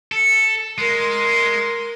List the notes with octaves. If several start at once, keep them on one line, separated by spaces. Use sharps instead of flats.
A4
G#3 A#4 C6